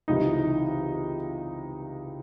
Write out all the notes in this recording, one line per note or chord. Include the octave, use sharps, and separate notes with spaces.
C#2 C3 E3 D#4